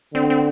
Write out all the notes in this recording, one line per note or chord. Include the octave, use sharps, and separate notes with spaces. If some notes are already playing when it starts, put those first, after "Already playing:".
D3 C4
C4